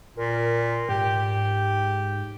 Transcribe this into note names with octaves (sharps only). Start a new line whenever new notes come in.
A#2 A#4
G#2 G4